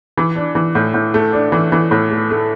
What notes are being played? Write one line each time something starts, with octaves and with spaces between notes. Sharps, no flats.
E3
D4
E3
A2
A2
A3
D4
E3
E3
A2
A3
A3